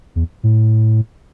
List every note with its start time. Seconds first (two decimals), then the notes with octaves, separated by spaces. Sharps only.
0.16 E2
0.43 A2